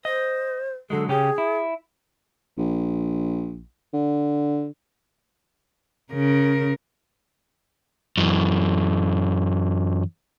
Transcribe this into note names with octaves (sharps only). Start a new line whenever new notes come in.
C5 D#5
D3 F#3 G#3 A4
C#3 C#4 G4 G#4
E4
A#1
D3
C#3 A#4
F#2 E3